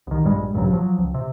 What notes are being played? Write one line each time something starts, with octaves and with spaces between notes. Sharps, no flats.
C2 D#3
A#1 G2 G3 G#3
A#1 G2 C#3 F#3
F3 F#3
C#2
C3